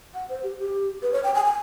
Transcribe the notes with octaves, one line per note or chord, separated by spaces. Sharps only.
F#5
C5
G4
G4
B4
C#5
G5
G#5
G#5